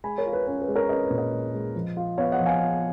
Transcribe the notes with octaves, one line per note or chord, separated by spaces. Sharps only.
G#3 G#5 B5
A#4 C#5
F4
B4
C#4 B4
B4
G#3
A#4 C#5
C#4 B4 D#5
B4
A#2
B4 D#5
G#3
G#3
F3
F4
B3 C#5 F5
D#5 F#5
F3
F5 G#5
F4